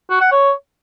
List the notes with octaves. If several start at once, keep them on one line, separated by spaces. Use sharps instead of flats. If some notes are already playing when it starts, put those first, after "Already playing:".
F#4
F#5
C#5